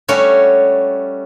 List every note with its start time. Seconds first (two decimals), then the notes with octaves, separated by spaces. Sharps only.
0.08 G3 A3 C#4 F#4 C#5